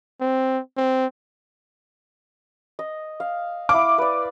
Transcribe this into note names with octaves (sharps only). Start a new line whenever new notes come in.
C4
C4
D#5
F5
E4 F5 D6
B4 D5